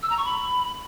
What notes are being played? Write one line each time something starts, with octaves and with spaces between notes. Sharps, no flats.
E6
A#5
C#6
B5